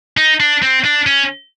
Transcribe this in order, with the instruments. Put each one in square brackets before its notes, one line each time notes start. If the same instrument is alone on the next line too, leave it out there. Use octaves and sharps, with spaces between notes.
[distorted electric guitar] D#4
D4
C4
D4
C#4